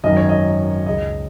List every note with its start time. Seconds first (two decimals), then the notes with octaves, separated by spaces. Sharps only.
0.04 G#1 F#2 D#3 D#5
0.17 C#5
0.29 D#5
0.86 C#2 C#3 G#3 D#5